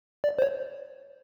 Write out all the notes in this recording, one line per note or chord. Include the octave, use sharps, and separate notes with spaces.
D5
C5
C#5